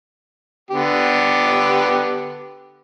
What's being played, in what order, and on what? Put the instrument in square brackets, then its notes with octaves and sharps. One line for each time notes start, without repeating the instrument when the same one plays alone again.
[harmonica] D3 B3 G4